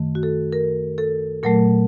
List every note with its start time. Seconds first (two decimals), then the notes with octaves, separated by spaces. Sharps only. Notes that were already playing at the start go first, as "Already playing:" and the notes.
Already playing: F#2 D#3 A3
0.15 F#4
0.23 A4
0.53 A#4
0.98 A4
1.43 A#2 F#3 A3 A#4